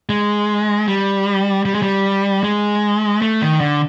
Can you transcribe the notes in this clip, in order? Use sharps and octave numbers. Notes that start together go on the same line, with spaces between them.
G#3
G3
G3
G#3
G3
G#3
A3
D#3
D3